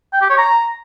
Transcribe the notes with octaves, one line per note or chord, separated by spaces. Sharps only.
G5
G4
C#5
A#5